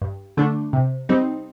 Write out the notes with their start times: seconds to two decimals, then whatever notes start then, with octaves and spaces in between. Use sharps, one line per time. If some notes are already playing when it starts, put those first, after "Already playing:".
0.01 G2
0.37 D3 A3 D4
0.73 C3
1.09 G3 C4 D#4